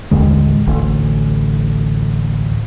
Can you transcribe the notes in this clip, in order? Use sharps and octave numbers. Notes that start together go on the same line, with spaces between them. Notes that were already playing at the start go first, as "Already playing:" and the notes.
A1 D#2 D3 G#3
A1 D2